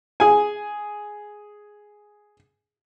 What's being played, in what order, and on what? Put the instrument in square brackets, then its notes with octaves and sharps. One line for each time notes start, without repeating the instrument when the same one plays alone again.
[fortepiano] G#4 G#5